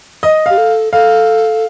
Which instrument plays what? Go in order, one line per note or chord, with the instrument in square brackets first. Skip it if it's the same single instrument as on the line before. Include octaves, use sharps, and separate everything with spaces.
[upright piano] D#5
[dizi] G4 [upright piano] F5
[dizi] A4
[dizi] A4 [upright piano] F5